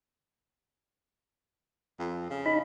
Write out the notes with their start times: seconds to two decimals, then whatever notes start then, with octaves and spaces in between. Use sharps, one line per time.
1.99 F2
2.30 C#3
2.46 D#4 B5